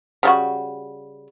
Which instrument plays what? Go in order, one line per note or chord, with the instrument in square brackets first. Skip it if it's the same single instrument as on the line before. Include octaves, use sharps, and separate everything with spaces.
[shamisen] C#3 G3 F#4